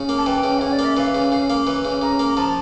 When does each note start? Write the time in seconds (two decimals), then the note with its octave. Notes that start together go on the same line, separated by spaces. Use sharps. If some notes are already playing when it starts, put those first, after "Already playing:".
Already playing: C#3
0.09 A#3
0.17 A5
0.26 E3 G5
0.43 C#3
0.59 C#3 C#5
0.72 D5
0.79 A#3
0.85 E5
0.97 E3 F5
1.15 C#3
1.32 C#3
1.50 A#3
1.67 E3
1.85 C#3
2.02 C#3 A#5
2.19 A#3
2.27 A#5
2.37 F3 A5